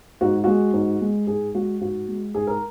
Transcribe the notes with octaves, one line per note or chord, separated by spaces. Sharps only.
G#2 F#4
G#3 F#4
G#2
G#3
G#2 G#4
G#3 F#4
G#2 F#4
G#3
G#2 G#4
A#4